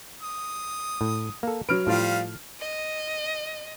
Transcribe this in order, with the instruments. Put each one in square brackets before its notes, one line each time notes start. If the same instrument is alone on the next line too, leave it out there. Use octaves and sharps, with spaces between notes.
[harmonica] D#6
[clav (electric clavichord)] A2
A#3 A4
[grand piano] F#3 F6 D7 [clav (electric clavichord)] B4
[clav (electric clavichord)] A2 [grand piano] F3 F4 [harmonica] G3 F5
[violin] D#5